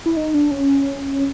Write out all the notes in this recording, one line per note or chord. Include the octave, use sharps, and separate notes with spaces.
E4
D#4
D4
C#4